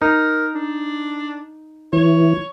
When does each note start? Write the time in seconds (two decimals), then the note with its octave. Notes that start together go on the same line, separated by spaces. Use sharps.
0.02 D#4 A#4
0.54 D4
1.93 E3 C#5